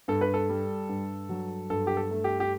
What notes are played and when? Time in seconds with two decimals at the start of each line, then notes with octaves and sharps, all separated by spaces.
0.08 G2 A4
0.21 B4
0.34 A4
0.49 G3
0.89 G2
1.29 F#3
1.70 G2 A4
1.87 G4
1.97 A4
2.10 A3
2.24 G4
2.40 G4